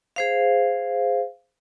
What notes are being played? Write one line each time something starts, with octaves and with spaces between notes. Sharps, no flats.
G#4 C5 F5